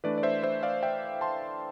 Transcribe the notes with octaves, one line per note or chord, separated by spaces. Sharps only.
E3 A3 D4 B4 D5
D5
C5 E5
C5 E5
D5 F5
E5 G5
A5 C6